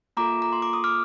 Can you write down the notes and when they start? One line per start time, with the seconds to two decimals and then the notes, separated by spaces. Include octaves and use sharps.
0.17 A#3 F4 A4 A#5 D6
0.42 A#5
0.53 C6
0.62 D6
0.73 D#6
0.84 D6 F6